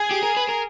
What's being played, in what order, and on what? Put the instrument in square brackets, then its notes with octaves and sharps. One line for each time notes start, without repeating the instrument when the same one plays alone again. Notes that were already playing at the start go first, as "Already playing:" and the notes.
Already playing: [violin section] G#4
[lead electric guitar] G4
A#4
B4
A#4